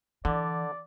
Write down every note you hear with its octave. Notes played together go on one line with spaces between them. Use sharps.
D3 E3 D5